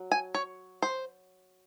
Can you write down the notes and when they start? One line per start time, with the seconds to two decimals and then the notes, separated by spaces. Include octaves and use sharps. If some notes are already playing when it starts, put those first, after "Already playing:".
Already playing: F#3
0.11 G#5
0.34 C#5
0.82 C5